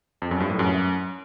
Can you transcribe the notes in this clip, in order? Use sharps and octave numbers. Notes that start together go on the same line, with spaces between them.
F2
F#2
G2
A2
F#2